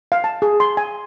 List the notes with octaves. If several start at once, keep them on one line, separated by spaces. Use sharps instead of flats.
F5
A5
G#4
C6
G#5